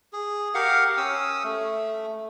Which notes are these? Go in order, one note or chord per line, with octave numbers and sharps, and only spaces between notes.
G#4
G4 A#4 F5 F#5
C#4 D#6 E6
A3